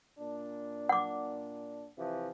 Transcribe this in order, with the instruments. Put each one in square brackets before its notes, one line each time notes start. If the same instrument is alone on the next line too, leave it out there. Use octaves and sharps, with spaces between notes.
[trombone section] A#2 D4
[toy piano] F#5 D6
[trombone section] C3 E3 F3